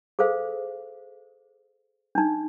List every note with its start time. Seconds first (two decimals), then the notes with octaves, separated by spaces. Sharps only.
0.19 G#4 A4 C5 F5
2.15 D4 D#4